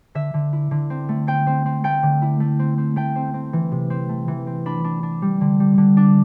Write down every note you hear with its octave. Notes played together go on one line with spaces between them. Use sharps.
D3 E5
D3
E4
D3
C4
A3
C4 G5
C4
C4
A3 G5
D3
E4
A3
C4
C4
A3 G5
C4
C4
E3
C3
C4
A3
E3
C4
D4 B5
D4
D4
G3
D3
G3
D3
D4